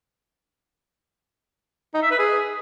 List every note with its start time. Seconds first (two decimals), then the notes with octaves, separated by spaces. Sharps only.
1.94 D#4
2.02 E5
2.11 B4
2.19 G#4